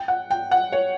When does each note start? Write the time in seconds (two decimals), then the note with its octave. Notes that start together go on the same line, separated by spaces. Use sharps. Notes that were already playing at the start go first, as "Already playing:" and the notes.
Already playing: G5
0.08 F#5
0.30 G5
0.51 F#5
0.72 C#5